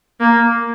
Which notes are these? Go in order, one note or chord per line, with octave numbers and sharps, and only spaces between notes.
A#3